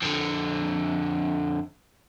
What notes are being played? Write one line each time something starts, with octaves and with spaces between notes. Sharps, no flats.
F2 D3